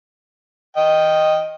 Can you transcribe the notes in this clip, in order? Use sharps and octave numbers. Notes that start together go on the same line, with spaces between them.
D#5 G5